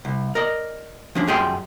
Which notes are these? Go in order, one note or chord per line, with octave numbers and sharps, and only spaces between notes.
C2
A#4 D5 D#5
F3 C#4 D4
F#2 F4 G4 G#4 D5 C6